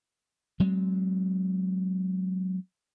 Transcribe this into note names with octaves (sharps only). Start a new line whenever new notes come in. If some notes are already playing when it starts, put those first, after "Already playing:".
F#3 G#3 C4